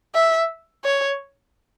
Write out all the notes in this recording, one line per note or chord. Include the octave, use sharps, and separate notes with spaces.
E5
C#5